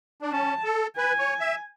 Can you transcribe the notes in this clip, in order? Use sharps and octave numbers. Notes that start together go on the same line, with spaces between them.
D4
C#4 A5
A4
B4 G#5
C#5
E5